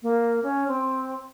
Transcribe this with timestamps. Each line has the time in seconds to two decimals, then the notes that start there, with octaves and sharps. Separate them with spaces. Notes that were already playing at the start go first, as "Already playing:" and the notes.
0.03 A#3
0.43 C#4
0.68 C4